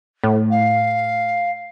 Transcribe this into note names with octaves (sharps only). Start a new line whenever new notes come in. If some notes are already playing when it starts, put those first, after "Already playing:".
A2
F5